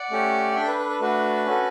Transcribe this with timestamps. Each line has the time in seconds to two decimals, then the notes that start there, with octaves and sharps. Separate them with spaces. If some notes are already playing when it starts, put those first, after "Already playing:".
Already playing: D5 F#5
0.11 A3 C#4 G4
0.51 F#5
0.55 D4 A4 E5 G5
0.67 B4
0.78 B4
0.89 B4
1.00 A3 D4 F#4 B4
1.46 C#4 F#4 A4